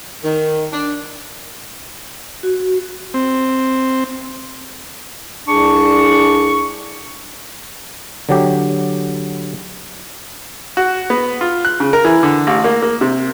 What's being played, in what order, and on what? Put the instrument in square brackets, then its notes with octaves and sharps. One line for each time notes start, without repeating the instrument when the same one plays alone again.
[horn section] D#3
D4
[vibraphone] F#4
[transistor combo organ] C4
[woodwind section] C2 D4 G#4 C#6
[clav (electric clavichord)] D3 F#3 G4
[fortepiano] F#4
B3
F4
F#6
C#3
A#4
E3
D3
A1
A#3
A#3
C3